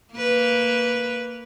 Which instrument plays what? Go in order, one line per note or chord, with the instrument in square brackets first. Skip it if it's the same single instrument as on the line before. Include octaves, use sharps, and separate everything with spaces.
[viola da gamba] A#3 B4